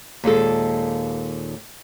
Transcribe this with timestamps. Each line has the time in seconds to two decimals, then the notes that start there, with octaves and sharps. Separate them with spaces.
0.24 D#2 A#2 G#3 A4